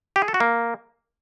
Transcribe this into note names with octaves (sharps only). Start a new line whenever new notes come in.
G4
G#4
A4
F#4
A#3